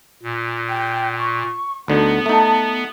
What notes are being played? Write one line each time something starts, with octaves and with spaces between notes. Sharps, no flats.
A#2
G5
C#6
D2 D3 B3 D#4
A3 D#4 A5